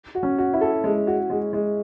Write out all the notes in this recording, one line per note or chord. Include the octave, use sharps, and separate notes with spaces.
F#4
C#4
F#4
E4
A4
G#3
F#4
G#3
G#3